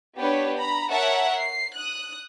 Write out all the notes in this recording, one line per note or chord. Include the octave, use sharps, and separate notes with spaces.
B3 D4 G4 B4 C#5
A#5 B5
A#4 C#5 E5 F#5 A5
C7
D#6 F#6